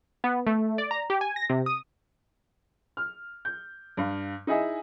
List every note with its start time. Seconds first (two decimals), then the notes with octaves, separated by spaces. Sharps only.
0.24 B3
0.47 A3
0.78 D5
0.91 A#5
1.10 G4
1.21 G#5
1.36 A#6
1.50 C3
1.66 D#6
2.97 F6
3.45 G6
3.97 G2 F5
4.47 D#4 E4 G#4 D#5 E5